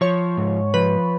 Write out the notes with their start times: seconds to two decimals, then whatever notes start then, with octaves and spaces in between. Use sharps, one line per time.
0.01 F3 C#5
0.37 G#2
0.74 F3 B4